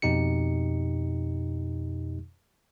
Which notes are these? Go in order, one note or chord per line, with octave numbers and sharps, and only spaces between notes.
F2 B2 D#4 G4 C#7